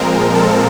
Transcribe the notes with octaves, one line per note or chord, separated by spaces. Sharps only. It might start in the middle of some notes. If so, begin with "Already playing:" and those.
Already playing: A#2 F3 G#3 C4 A#4
A4